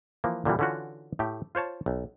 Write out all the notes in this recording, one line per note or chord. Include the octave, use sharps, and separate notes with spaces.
E3 F3 A#3
A#2 D3 E3 G3
D3 E3 C#4 F4 F#4
A2 A3 G4
F4 C5 C#5 A5
B1